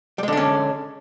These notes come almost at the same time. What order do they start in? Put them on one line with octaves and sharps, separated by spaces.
G3 G#3 D3 D4 C#4